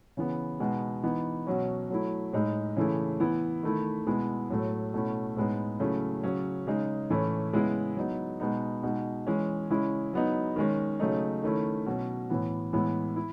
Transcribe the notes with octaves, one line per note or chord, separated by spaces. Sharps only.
C#3 E3 B3
B2 G#3 B3 D#4
E3 B3 D#4
B2 F#3 C#4
F#3 A3 E4
A2 G#3 D#4
C#3 E3 A3 E4
E3 B3 E4
D#3 A3 E4
B2 G#3 B3 E4
A2 F#3 A3
B2 A3 C#4 E4
A2 G#3 B3 D#4
C#3 F#3 A3 C#4 E4
C#3 F#3 C#4
C#3 G#3 D#4
A2 E3 A3 C#4 E4
C#3 G#3 B3 E4
F#3 B3 D#4
B2 G#3 B3 D#4
B2 G#3 D#4
E3 G#3 C#4
C#3 G#3 C#4 E4
F#3 B3 D#4
D#3 G#3 C#4
C#3 F#3 A3 D#4
D#3 A3 C#4 E4
B2 F#3 C#4
A2 E3 B3
A2 E3 G#3 B3 E4
E4